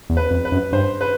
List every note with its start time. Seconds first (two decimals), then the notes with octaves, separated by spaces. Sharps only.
0.10 E2
0.17 B4
0.31 F2
0.45 B4
0.52 F#2
0.72 G2 C5
1.01 B4